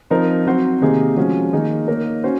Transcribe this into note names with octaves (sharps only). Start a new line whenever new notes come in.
F3 C4 D#4 A#4
F#3 C4 F#4 C5
C3 D#3 A#3 D#4 G#4
F3 G#3 C#4 F#4
D#3 A#3 D#4 G#4
A#3 D#4 A#4 C#5
C#4 F#4 C5